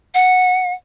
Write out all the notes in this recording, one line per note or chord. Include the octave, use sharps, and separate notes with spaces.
F#5